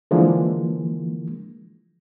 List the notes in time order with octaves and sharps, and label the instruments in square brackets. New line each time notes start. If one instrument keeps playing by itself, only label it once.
[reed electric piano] D3 E3 F3 G#3 A#3